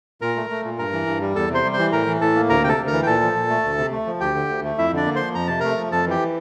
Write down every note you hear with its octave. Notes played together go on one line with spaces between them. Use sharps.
A#2 A#4 A#5
A3
A3
A#2
G2 A#4 A#5
E3
G2
G3
E2 A4 A5
C3 C5 C6
G3
C5 C6
E3
A2 A#4 A#5
E3
A2 A4 A5
A#3
D2 A#4 A#5
C3 G5
A4 A5
D2
A#4 A#5
E3
G5
A#2 A4 A5
F3
A#2
A3
D2
C3
A3
F3
D2 G4 G5
D3
D2
A3
F2 E4 E5
D3 D4 D5
A#3
F3 C5 C6
F2 A#5
C3 A5
A3 A#4 A#5
F3
F2 A4 A5
E3 G4 G5